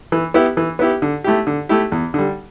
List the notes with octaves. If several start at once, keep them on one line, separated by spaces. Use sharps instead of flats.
E3
B3 E4 G4
E3
B3 E4 G4
D3
A3 E4 G4
D3
A3 E4 G4
E2
D3 G3